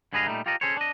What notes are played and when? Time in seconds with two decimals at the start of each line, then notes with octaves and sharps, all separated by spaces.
0.13 G2 D3 G#4 B4 D#5 F5
0.26 A#2 G3 A3 D#4
0.46 F4 G4 A4 A#4 D#5
0.61 C#4 D#4 G#4 A4 C5 C#5
0.77 D4 D#5